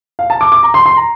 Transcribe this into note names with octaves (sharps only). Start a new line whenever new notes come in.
F5
A5
D6
D6
A#5
C6
C6
A#5